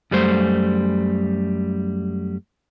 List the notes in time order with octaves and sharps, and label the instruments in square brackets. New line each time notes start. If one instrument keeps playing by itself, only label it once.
[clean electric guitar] F#2 G3 A3 C5